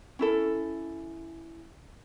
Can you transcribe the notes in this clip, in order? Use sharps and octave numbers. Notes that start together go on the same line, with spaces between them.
C#4 E4 A4